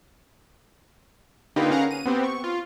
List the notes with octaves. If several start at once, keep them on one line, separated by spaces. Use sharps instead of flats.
D3 A#3 D#4 F4 G4 B4
C#4 G#4 A#4 F5 F#5 A#5
D#7
B3 C4 G4
C#6
F4